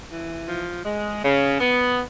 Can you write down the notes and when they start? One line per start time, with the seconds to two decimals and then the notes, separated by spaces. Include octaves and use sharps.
0.10 E3
0.47 F3
0.84 G#3
1.23 C#3
1.60 B3